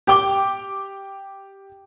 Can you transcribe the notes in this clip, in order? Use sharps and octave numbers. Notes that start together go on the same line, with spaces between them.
G4 G5 D6 G7